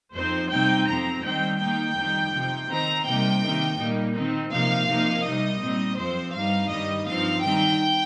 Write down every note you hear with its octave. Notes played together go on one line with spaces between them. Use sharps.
F2 F3 C4 D#4 C5
C3 G3 C4 D#4 G5
F2 F3 C4 A#5
D#3 G3 C4 D#4 G5
D#3 A#3 D#4 G5
F2 D#3 G3 D#4
C3 F3 D#4
D#3 C4 D#4 A#5
C3 G3 A#3 D#4 G5
C3 D#3 A#3 D#4
A#2 G3 A#3 D#4
D#3 C4 D#4
C3 F3 A#3 D#4 F5
C3 F3 A#3 D#4
C3 G3 D#4 D#5
A#2 G3 C4 D#4
F2 F3 C4 C5
G2 G3 D#4 F5
G2 D#3 G3 D#4 D#5
G2 F3 C4 D#4 F5
D#3 G3 C4 D#4 G5